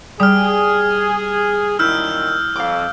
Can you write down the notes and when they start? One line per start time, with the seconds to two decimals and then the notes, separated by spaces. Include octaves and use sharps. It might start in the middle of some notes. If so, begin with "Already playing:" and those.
0.20 G3 G#4 D#6 F6
1.79 F#2 A#2 D#3 E4 E6 F6 G6
2.56 F2 F5 D6